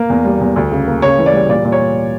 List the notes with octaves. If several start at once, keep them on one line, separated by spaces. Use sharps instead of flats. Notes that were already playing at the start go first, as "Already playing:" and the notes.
Already playing: A#3
E2
G3
E2
D2
C#3
A#3
C#3 C#5
E3
D5
G3
A#2 D5
A#2
C#5